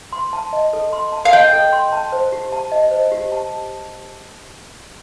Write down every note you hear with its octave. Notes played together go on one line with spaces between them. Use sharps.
C6
A5
D#5
A4
C6
A5
F5
D#5 G5
A4
C6
A5
C5
G4
A5
D#5
C5
G4
A5